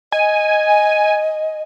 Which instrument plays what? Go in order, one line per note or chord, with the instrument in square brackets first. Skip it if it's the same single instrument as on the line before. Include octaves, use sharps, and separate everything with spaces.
[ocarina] D#5 [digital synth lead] G#5